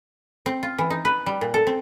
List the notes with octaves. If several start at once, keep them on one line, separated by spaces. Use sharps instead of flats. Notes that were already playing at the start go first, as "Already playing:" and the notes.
C4
F4
E3
D#4
B4
G3
A#2
A4
C4